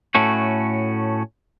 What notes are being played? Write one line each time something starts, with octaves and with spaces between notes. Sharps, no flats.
A2 A3 C#4 F#4